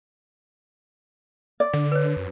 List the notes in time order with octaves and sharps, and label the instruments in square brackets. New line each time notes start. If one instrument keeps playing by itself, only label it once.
[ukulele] D5
[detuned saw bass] D3
[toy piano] B4 C#5
[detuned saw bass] F#2